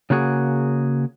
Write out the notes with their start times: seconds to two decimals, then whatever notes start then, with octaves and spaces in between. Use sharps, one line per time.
0.10 C#3 A#3 F#4 G#4